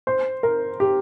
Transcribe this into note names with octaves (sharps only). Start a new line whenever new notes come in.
C5
A#4
G4